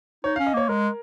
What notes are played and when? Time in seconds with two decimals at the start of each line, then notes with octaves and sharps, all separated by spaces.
0.24 D#4 C#5
0.36 F5
0.39 C#4
0.47 D#5
0.54 A#3 C#5
0.69 G#3 A#4